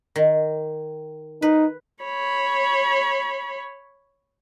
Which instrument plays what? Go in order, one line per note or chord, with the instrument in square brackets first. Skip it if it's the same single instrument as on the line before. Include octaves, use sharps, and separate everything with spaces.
[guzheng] D#3
[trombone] D#4 [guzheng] B4
[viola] C#5 B5